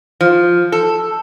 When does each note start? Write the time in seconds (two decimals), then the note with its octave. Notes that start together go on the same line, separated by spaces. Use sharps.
0.21 F3
0.72 A4